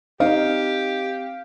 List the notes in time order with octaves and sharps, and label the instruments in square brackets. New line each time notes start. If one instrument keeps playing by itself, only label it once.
[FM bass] C4 [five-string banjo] D#4 [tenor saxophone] G4 [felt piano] F5